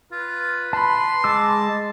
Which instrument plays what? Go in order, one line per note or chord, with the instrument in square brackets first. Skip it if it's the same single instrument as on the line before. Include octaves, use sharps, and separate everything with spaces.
[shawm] F4 [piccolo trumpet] B4
[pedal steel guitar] A5 B5 [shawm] C6
[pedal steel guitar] G#3 D6 E6 [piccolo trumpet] A5